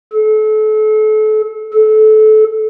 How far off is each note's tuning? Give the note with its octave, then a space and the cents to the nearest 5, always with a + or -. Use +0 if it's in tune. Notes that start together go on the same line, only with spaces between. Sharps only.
A4 -35
A4 -25